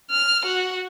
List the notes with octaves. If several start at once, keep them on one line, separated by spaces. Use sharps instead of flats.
F6
F#4